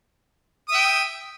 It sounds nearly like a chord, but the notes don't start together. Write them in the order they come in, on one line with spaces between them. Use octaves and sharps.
D#6 E5 G5